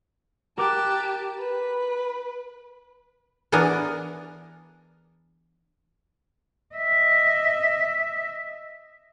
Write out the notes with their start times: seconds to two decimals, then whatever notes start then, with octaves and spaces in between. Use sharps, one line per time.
0.58 G4 A#4 A5 D6 F#6
1.38 B4
3.52 E3 B3 D4 G#4 A#4 D5
6.75 D#5 E5